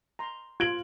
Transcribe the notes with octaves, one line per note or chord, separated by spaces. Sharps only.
A#5 C6
F4 G#6 D7 F#7